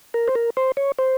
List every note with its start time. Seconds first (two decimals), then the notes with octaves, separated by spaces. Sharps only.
0.14 A#4
0.28 C5
0.35 A#4
0.57 C5
0.77 C#5
0.99 C5